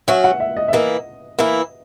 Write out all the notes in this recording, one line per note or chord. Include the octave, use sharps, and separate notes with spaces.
F#3 C#4 F#4 E5
F#5
E5
D#5
E5
E3 A#3 E4 D#5
E3 A#3 E4